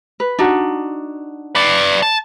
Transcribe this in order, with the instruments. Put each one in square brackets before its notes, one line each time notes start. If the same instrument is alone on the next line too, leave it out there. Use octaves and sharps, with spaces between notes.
[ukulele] B4
D4 D#4 F#4
[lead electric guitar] B4 D5
A5